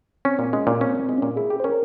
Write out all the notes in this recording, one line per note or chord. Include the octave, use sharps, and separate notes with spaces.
C4 C#4
A#2
G#3 C#4
A#2
C4 C#4
A#2 C4
G#3
A#2 C#4
E4 G#4
G4
C5
C#4 A#4